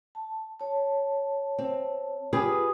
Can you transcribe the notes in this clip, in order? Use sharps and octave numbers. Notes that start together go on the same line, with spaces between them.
A5
C#5 A5
C4
F4 G4 G#4 B4 D#6